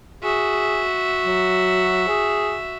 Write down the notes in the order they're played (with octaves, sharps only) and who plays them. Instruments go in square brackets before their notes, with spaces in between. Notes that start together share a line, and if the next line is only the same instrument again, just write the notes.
[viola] F#4 E5 [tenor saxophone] G#4
[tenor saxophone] F#3
G#4